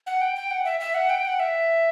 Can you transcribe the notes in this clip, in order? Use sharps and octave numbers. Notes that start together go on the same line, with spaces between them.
F#5
G5
G5
F#5
E5
E5
F#5
G5
F#5
E5